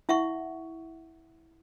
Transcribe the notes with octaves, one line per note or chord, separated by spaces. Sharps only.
E4 E5 F#5 C#6